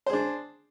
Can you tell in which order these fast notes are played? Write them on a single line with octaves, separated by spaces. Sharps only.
C5 G#4 D4